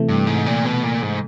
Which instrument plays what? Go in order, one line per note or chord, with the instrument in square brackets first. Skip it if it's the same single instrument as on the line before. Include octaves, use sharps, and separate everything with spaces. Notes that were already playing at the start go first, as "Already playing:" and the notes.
Already playing: [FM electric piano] C3 E3 A3
[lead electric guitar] G2
G#2
A#2
B2
A#2
G#2